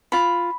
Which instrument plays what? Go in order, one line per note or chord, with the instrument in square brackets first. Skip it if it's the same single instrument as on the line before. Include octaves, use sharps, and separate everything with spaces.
[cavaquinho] F4 B5